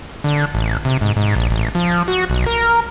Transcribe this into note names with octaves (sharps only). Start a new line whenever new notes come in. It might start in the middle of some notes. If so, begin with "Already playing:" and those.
D3
A1
C3
G#2
G#2
A#1
A1
F3
F#4
B1
A#4